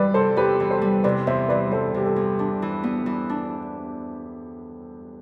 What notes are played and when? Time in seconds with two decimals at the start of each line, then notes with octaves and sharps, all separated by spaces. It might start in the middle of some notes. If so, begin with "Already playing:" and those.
Already playing: E3 G3 B4 D5
0.14 C3 A4 C5
0.36 E2 G4 B4
0.60 E3
0.71 A4 C5
0.82 G3
1.04 C3 B4 D5
1.27 E2 C5 E5
1.49 E3 B4 D5
1.72 G3 A4 C5
1.94 C3 G4
2.06 A4
2.16 E2
2.39 D4
2.62 E3
2.84 B3
3.06 E3
3.29 D4